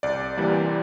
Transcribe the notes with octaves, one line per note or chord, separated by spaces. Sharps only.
C2 D5
C3 E3 G3 A#3 D5